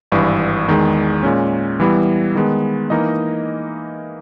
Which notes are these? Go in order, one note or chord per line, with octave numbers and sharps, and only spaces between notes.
G#1 G2 E3
E2 D#3 G#3
A#2 G#3 C#4
E3 G3 B3 E4
D#3 G#3 B3
E3 A#3 D#4 A#4 D#5